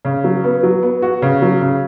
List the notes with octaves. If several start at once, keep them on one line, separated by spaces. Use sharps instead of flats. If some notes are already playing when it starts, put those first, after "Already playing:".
C#3
F#3
B3
F#3
B3
F#4
C#3
F#3
C#3